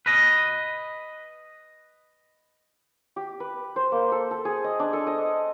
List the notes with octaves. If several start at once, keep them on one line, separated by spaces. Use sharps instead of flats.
B4 D#5
G4
B4
C5
A#3
A4
A4
G#4
D#5
D4
A4
D#5